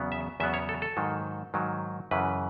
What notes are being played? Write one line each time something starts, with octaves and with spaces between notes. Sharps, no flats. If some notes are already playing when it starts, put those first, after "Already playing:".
Already playing: E2 C#3 F#3 B3
E5
E2 C#3 F#3 B3 E5
C#5
A4
A4
G#2 D#3 F#3
G#2 D#3 F#3
F#2 C#3 E3 B4